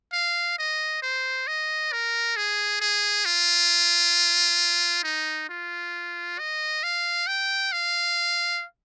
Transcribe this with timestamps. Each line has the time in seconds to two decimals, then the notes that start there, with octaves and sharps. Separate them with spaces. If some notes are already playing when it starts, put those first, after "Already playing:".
0.13 F5
0.59 D#5
1.02 C5
1.47 D#5
1.92 A#4
2.36 G#4
2.81 G#4
3.25 F4
5.04 D#4
5.49 F4
6.39 D#5
6.83 F5
7.27 G5
7.72 F5